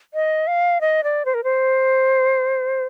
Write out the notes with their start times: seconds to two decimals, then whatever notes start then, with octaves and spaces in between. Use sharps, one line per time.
0.14 D#5
0.47 F5
0.81 D#5
1.04 D5
1.25 C5
1.34 A#4
1.44 C5